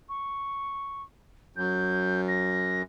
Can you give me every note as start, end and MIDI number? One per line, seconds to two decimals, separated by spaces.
0.09 1.02 85
1.56 2.82 42
1.56 2.21 91
2.28 2.81 94